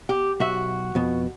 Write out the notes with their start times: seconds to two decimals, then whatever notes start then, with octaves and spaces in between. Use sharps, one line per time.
0.09 G4
0.40 B1 F#4 E5
0.95 F2 B2